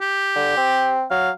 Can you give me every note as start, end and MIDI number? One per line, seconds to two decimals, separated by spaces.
0.01 0.94 67
0.35 0.54 50
0.57 1.04 60
1.11 1.30 54
1.11 1.30 77